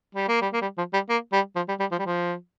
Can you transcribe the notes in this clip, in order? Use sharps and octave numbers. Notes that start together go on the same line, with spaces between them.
G3
A#3
G3
A#3
G3
F3
G3
A#3
G3
F3
G3
G3
F3
G3
F3